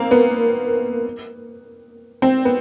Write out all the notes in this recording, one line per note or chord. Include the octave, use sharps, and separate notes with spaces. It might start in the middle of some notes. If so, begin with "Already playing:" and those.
Already playing: A#3 C4
B3
C4
B3